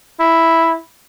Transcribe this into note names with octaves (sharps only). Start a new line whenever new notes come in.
E4